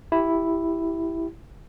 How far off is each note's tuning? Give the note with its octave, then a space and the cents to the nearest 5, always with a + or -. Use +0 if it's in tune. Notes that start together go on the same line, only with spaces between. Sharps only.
E4 +0 G4 -5